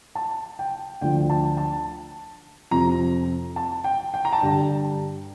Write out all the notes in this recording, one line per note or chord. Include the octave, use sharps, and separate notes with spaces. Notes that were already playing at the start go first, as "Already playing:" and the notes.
A5
G5
D2 D3 F3 G5
A5
A5
F2 C3 F3 A#5
A5
G5
G5
A#5
A5
G2 D3 G3 G5